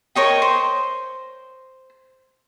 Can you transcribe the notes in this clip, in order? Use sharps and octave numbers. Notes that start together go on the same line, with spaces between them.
A#4 C#5 D#5 G5
C5